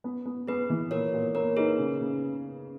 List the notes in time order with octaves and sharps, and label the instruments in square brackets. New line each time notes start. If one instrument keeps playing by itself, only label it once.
[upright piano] B3
B3
[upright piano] B3 [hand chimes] G#4 B4
[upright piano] E3
[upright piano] A#2 [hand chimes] A#4 C#5
[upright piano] A#2
[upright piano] A#3 [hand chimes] A#4 C#5
[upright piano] D#4 [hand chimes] G#4 B4
[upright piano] C#3
C#3